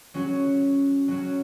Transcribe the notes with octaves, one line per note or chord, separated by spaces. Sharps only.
F#3 C#4 F#4
F#3 C#4 F#4